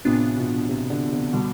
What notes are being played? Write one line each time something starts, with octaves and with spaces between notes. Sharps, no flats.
A2 C3 E3 B3 D4 F4
B2
C3
D3
C3
B2 D3 G3